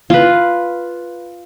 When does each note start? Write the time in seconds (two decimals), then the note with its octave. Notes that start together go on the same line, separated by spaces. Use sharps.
0.10 F4 B4